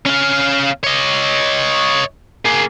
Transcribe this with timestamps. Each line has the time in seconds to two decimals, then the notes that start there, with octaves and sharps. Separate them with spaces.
0.06 C#4 F5
0.84 C#5 D#5
2.45 A#3 G#4